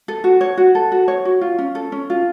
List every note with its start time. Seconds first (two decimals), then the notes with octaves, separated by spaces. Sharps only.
0.08 A4
0.24 F#4
0.41 C#5
0.57 F#4
0.75 A4
0.92 F#4
1.08 C#5
1.25 F#4
1.41 F4
1.58 C#4
1.75 A4
1.92 C#4
2.10 F4